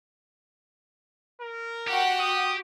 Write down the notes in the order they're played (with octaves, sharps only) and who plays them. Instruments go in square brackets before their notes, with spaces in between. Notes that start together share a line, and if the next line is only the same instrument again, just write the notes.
[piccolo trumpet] A#4
[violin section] F#4 F#5 G5 [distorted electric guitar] G4
[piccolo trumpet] D#6